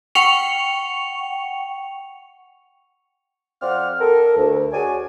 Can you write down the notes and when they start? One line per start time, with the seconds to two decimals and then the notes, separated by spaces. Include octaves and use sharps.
0.15 F#5 G5 C#6 C#7 F7
3.62 F2 C4 D5 F5 F#5 F6
4.01 A4 A#4
4.36 D2
4.72 F#4 G#4 C#5 D5 G#5